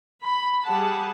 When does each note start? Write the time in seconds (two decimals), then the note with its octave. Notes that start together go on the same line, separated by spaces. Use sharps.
0.22 B5
0.65 G3 G#4 F#5 A5